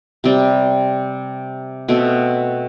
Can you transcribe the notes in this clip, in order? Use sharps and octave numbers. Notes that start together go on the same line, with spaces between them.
C3 G3 C4
B2 A3 C4